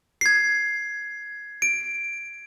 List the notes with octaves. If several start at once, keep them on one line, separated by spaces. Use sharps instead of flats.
G#6 C7
D7